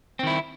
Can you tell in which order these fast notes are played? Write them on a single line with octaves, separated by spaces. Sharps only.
C4 D#3 E4